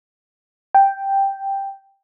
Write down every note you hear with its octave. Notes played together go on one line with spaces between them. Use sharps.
G5